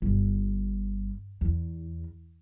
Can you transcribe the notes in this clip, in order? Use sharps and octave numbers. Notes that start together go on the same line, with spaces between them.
G1
E2